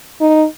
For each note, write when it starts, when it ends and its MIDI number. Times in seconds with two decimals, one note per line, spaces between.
0.21 0.45 63